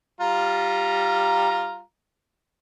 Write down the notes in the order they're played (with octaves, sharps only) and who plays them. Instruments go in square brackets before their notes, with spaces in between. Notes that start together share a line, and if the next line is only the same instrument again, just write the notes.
[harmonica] G3 F4 A#5